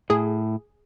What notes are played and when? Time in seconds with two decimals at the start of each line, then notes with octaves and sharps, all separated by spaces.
0.10 A2 G#4